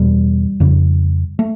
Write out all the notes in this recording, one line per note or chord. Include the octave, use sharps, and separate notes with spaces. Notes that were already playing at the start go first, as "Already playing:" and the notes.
Already playing: E2 B2 G3
F2 C#3
A3